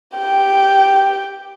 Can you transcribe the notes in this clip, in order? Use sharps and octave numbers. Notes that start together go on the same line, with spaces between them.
G4 G5